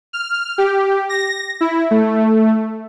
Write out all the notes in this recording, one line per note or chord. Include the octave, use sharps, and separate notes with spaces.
F6
G4
A#6
E4
A3